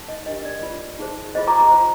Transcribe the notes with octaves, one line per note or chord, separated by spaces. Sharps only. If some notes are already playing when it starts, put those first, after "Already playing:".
Already playing: D#4
D#5
D4 G4 A#4 D#5
D5
F4 C5
D#4 G#4 C5
F4 G#4 C5 D#5
A#5 D6
A#5 D6
F4 C5